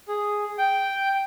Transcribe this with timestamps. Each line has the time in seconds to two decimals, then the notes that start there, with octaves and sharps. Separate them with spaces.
0.08 G#4
0.58 G5